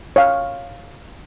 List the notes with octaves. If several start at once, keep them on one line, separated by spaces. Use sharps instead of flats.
C#5 F5